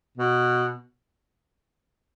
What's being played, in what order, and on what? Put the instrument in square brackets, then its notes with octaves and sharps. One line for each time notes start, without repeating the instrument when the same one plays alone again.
[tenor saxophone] B2